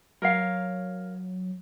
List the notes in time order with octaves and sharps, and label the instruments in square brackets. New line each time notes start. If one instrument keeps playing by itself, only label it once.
[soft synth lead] F#3 [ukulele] A#4 C#5 F5